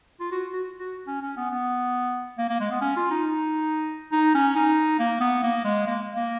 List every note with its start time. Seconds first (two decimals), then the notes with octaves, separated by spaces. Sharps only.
0.20 F4
0.32 F#4
0.53 F#4
0.78 F#4
1.07 C#4
1.21 C#4
1.37 B3
1.51 B3
2.38 A#3
2.49 A#3
2.60 G#3
2.71 B3
2.81 C#4
2.96 F4
3.11 D#4
4.12 D#4
4.34 C#4
4.55 D#4
4.99 A#3
5.21 B3
5.43 A#3
5.64 G#3
5.86 A#3
6.16 A#3